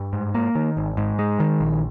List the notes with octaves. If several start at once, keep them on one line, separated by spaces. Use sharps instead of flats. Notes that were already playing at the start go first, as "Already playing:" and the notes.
Already playing: G2
G#2
A#3
D#3
G#1
G#2
G#3
D#3
A#1